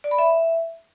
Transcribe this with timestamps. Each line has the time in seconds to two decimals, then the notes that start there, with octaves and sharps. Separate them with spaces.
0.04 D5
0.11 B5
0.19 E5